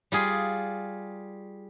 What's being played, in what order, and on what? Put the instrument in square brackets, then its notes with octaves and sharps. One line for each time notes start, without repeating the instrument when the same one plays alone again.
[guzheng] G3 F4 G#4